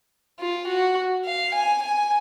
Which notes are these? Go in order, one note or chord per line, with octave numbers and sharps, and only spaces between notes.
F4
F#4
F5
G#5
G#5